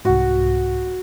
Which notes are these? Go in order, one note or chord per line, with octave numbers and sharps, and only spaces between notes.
C2 G#2 F#4